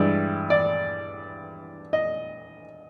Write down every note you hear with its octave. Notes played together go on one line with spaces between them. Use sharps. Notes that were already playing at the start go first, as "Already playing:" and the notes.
Already playing: G2 E3 G#3 D5
D5
D#5